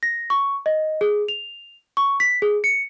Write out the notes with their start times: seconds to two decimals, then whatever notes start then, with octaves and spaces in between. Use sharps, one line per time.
0.03 A#6
0.30 C#6
0.66 D#5
1.01 G#4
1.28 F7
1.97 C#6
2.20 B6
2.42 G#4
2.64 C#7